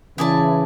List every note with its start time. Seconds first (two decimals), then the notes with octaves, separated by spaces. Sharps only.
0.18 C#3 E3 E4 G#4 D5 A5